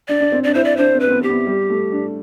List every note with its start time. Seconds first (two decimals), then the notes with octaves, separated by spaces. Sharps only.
0.08 D4 D5
0.20 D4
0.32 C4
0.44 D4 D5
0.54 E4 C5
0.65 D5
0.77 D4 C5
0.95 C4
1.00 B4
1.08 C4
1.12 B3
1.23 G4
1.29 B3
1.46 G3
1.70 A3
1.92 D4